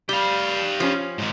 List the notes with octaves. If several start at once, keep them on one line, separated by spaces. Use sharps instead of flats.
G3 G4 F5
F3 C#4
G#2 D#3